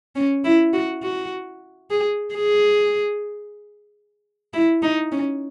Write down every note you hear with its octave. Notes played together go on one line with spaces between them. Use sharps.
C#4
E4
F#4
F#4
G#4
G#4
E4
D#4
C#4